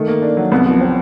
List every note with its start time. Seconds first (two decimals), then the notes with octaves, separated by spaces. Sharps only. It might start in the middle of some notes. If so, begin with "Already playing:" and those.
Already playing: D#3 A3
0.08 A#3
0.22 D4
0.37 F#3
0.52 C2 B3
0.66 F3
0.81 C4